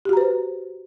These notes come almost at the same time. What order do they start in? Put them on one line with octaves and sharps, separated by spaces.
G4 F#4 A#5 B4 C5